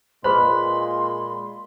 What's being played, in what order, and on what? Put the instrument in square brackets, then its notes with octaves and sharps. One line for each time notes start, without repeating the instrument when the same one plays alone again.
[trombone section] A#2 G#3 [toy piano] G#4 B4 C5 [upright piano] B5 [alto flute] C6